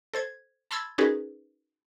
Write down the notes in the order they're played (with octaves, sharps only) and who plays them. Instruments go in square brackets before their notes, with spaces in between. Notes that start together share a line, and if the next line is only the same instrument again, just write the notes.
[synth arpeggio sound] A4 C5 G#6
A5 B5 C6 E6 G#6 A6
C#4 D#4 F#4 G#4 A#4 B4